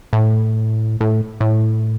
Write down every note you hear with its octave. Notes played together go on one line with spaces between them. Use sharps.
A2
A2
A2